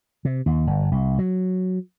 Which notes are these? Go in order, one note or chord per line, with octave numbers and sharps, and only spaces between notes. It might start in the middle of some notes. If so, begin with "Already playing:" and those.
C3
D#2
G1
C2
F#3